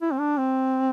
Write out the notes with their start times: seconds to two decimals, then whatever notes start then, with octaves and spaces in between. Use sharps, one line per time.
0.02 E4
0.12 C4
0.20 D4
0.38 C4